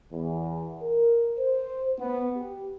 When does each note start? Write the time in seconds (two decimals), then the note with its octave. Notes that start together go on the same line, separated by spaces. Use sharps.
0.12 E2
0.82 A#4
1.39 C5
1.99 B3
2.38 G4